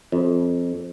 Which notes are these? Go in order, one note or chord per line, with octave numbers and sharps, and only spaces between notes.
F2